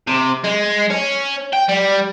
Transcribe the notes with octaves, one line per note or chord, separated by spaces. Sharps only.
C3
G#3
C#4
G5
G3